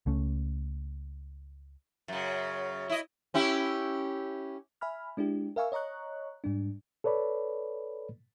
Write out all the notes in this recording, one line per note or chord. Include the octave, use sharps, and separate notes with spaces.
C#2 A3 C#4
F#2 C#3
E4 D#5
C#4 E4 G4
E5 G#5 B5 F6
G#3 D4 E4 G4
A#4 E5 F5 G#5 C#6 E6
C#5 D#5 A#5 C#6 F#6
G#2 G3 D4
A4 B4 C#5 D5 B5